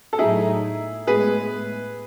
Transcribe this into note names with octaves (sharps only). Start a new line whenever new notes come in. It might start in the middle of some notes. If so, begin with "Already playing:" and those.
A4
A2 F#3 A3 D#4 E4 G#4
A2 G#3 B3 G#4 B4